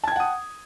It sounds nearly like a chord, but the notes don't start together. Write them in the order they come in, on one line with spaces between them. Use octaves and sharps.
A5 G#6 G5 F#5 D#6